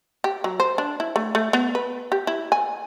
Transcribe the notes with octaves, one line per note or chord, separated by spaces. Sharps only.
G4
F#3
C5
D4
E4
A3
A3
B3
B4
G4
E4
G#5